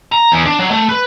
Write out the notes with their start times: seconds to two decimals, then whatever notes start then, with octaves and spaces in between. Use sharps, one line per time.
0.12 A#5
0.32 E2
0.46 D4
0.59 F#3
0.71 A3
0.89 B4